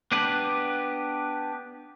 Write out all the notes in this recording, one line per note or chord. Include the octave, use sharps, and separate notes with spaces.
B3 D4 G4 B4